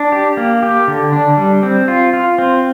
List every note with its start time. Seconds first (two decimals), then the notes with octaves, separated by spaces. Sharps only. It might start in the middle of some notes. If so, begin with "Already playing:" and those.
Already playing: D4
0.12 G4
0.37 A#3
0.63 G4
0.88 D3
1.13 D4
1.37 G3
1.63 C4
1.88 F4
2.13 F4
2.38 C4